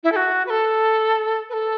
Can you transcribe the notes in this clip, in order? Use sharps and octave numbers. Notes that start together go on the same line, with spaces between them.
E4
A4
F#4
B4
A4
B4
A4